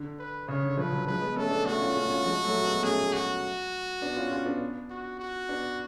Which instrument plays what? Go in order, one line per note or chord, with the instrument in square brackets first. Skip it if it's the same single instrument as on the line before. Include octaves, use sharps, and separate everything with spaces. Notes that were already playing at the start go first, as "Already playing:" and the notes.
Already playing: [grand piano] D3
[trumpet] B4
[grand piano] C#3 [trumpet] C#5
[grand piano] D3
[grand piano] C#3 F3 [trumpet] B4
[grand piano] D3 F#3
[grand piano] F3 G#3 [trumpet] B4
[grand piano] G#3 B3
[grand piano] A3 C#4 [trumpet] A4
[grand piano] B3 D4
[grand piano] A3 C#4 [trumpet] F#4
[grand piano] C#4 F4
A3 C#4
C#4 F4
F3 G#3
F#3 A3
G#3 B3
[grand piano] A3 C#4 [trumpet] G#4
[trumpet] F#4
[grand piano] B3 D4
C#4 F4
C#4 F4
B3 D4
[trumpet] F#4
F#4
[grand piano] B3 D4